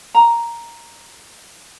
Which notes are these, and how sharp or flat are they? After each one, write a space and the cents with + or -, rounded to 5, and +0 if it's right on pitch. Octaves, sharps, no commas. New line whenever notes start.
A#5 +0